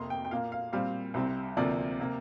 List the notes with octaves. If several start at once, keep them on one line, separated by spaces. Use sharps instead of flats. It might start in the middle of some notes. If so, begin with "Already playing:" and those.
Already playing: F2 C3 A#3 C6
G5
G5
A#2 A#3 F5
F5
A#2 G3 C4 F5
C2 C3 G3 C4
D2 C3 F3 A#3 D5
C3 A#3